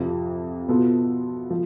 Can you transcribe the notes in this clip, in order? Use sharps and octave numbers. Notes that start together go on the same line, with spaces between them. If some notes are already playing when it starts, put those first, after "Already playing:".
Already playing: F2 C3 F3
B2 B3 F4 A4
F3